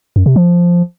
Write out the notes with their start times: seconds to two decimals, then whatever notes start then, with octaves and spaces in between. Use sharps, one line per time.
0.16 F#2
0.26 C3
0.36 F3